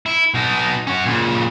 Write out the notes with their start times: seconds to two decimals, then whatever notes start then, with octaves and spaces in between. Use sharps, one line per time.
0.06 E4
0.34 B2 D#4
0.87 C#4 F#4
1.06 A#2 C#3